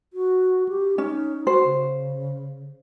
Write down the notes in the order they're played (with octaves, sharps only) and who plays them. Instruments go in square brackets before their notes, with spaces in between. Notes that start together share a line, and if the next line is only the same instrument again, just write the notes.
[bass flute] F#4
G4
[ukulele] C#4 [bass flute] D#4
[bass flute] F#4 [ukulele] C5
[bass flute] C#3